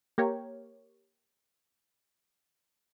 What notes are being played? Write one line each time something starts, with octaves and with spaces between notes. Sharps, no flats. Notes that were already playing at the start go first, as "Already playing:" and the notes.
A#3 G4 A#4 C#5